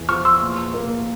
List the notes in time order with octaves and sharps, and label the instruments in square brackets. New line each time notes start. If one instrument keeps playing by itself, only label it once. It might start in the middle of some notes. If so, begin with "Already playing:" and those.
Already playing: [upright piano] E2
[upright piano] F3 [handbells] C#6 F6
[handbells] C6 E6
[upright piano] A#2
A#3